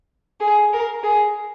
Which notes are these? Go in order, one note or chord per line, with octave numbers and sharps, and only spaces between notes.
G#4
A#4
G#4